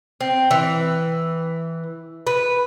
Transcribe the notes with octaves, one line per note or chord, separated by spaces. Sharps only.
C4
E3
B4